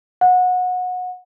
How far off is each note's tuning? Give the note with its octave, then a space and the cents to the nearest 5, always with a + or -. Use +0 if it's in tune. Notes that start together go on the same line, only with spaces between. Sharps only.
F#5 -25